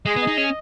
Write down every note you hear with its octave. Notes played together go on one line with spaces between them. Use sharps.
G#3 G#4
B3
D#5
D#4
C#4 G#5